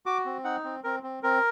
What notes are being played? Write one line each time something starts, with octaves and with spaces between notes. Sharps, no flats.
F#4 D6
C4
D#4 F#5
C4
C4 A#4
C4
C4 A#4